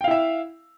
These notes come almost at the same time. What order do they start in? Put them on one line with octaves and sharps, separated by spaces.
G5 F5 E4 E5